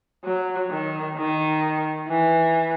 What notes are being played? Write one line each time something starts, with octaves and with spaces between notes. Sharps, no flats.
F#3
D#3
D#3
E3